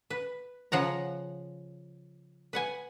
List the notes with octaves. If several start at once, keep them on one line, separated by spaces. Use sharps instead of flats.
B4
C#3 F3 F#5 A#5
B4 F#5 G#5